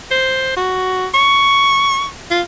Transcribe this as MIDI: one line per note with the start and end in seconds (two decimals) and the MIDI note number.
0.11 0.53 72
0.57 1.07 66
1.14 2.06 85
2.31 2.41 65